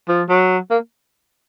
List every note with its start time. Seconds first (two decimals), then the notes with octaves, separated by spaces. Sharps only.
0.08 F3
0.29 F#3
0.71 A#3